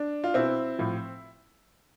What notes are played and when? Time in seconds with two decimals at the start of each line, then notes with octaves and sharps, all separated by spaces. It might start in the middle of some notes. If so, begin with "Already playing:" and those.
Already playing: D4
0.24 F4
0.34 B2 C4 E4
0.79 A2 F3